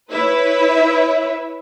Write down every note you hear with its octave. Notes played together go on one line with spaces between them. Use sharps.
E4 B4 C#5 E5